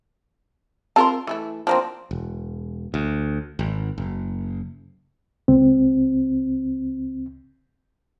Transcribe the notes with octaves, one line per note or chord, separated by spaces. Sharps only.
C4 F4 A#4 A5 C6
E3 A3 E4
F3 A#3 C4 D4
E1
D2
G#1
F#1
C#2 C4